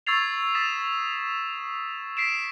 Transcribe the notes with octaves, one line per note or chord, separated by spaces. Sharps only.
C#6 E6 G#6 A6 C7 F7
D#6 A6 B6 E7
B6 C7 D7 E7